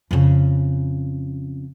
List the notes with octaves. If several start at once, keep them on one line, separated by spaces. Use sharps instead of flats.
F2 C#3